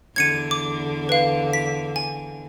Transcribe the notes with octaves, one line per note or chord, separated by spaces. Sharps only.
E2 D3 G#6 C#7 D#7
D6
B4 F5
B6
G#5